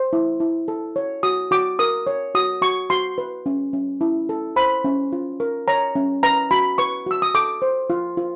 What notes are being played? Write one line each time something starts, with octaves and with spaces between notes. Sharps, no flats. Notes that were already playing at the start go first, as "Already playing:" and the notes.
Already playing: C5
E4
E4
A4
C#5
F#4 D#6
F#4 D6
A#4 D#6
C#5
F#4 D#6
F#4 C#6
F#4 C6
B4
C#4
C#4
E4
A4
C5 B5
C#4
F4
A#4
C#5 A#5
C#4
B4 A#5
F#4 B5
B4 C#6
F#4 E6
D#6
A4 D6
C5
F4
F4